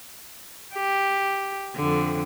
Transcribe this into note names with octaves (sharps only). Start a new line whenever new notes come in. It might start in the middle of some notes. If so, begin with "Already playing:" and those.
G4
F2 D3